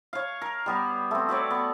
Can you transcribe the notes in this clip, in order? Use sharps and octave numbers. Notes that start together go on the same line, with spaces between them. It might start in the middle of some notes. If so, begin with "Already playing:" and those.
C#5 F5
A#4
G3 B3 B4
A3 C4
F#4 B4 C#5 D5
B3